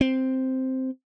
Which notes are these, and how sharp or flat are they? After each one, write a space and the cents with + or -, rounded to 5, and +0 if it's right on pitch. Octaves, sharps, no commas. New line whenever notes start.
C4 +0